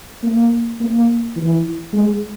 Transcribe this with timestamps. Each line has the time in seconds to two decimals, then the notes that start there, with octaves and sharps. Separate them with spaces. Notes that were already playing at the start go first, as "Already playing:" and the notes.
0.23 A#3
0.80 A#3
1.36 E3
1.93 G#3